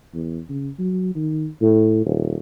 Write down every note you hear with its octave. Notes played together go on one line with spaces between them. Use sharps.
E2
C#3
F#3
D#3
A2
D#1